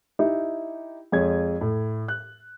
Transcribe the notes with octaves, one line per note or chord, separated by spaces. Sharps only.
D#4 E4 G4
F2 G#3 C#5 G#6
A2
F#6